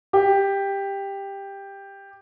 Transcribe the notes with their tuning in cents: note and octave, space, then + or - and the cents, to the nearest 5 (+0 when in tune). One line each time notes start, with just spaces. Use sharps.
G4 +10